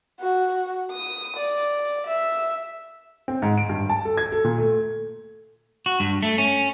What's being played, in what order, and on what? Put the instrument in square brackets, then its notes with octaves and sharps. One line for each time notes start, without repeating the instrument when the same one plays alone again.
[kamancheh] F#4
D#6
D5
E5
[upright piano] C4
G#2
D7
G2
A5
A4
G#6
A4
A#2
A3
[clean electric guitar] F#4
G2
A3
C#4